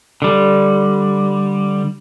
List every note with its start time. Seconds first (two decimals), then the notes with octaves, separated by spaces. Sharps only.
0.22 D3 G3